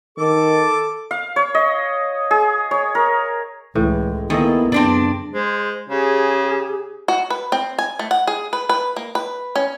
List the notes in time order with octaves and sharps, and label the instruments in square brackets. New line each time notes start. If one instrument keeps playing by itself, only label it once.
[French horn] D#3 [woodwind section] A4 [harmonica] D6
[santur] F5
C#5
D#5
G#4
C#5
A#4
[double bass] C#2 G#3 [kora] A2 [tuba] E3
[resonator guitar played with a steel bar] D#3 [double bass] A#3 E4 [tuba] B3 [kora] G#4 A4 D#5
[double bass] F#2 C#3 [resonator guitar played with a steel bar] C4 D4 D5
[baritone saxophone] G#3 [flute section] C5
[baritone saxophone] C#3 [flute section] G4 G#4
[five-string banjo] F#4
B4
C4
G#5
A3
F#5
G#4
B4
B4
A#3
B4
C#4